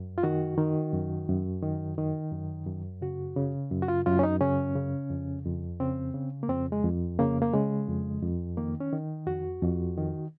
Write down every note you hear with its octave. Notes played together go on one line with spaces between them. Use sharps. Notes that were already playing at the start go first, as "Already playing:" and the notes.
Already playing: F#2
F4
D#3 F#4
D#3
F#2
F#2
D#3
D#3
F#2
F#2
C#3 F#4
C#3
F#2
F#4
F4
F#2 F4
C#4
D#4
C#3 C#4
C#3
F2
F2
C#3 C4
C#3
A#3
F2 C4
G#3
F2
C#3 A#3
A#3
C#3 G#3
F2
F2
D#3 A#3
C#4
D#3
F2 F#4
F2
D#3